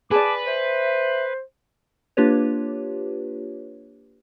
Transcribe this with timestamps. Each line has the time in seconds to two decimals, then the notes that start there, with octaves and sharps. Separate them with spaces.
0.11 G#4 B4 D5 A5 D6
0.46 C5 E5
2.17 A#3 D4 F4 G4 B4 C#5